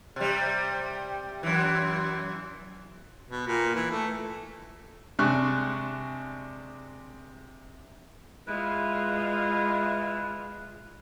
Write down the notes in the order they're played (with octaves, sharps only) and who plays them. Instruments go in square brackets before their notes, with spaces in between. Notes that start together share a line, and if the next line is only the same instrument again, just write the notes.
[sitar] C3 G3
F#2 E3
[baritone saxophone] B2
A#2
E3
A3
[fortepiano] C3 G#3 D4 C#6 F#6
[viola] G#3 F4 [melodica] E4 B4